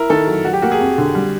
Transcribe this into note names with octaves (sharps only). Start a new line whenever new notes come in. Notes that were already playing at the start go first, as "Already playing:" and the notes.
Already playing: E4 A#4
D#3 A4
F#3
F#3 F#4
G4
A#3 F#4
G#4
F2
D3
G3